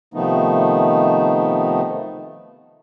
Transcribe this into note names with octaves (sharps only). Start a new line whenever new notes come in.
C3 D#3 F3 A3 B3 D#4